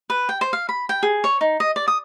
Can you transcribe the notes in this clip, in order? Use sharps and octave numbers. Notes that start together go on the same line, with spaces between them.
B4
G5
C5
F5
B5
G5
G#4
C#5
D#4
D#5
D5
D#6